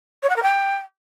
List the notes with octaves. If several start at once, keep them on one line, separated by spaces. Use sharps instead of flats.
C#5
F#5
A#4
G5